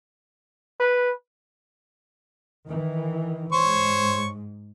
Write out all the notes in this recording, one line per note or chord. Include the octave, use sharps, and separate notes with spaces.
B4
D#3 E3
G#2 C5 C#5 C#6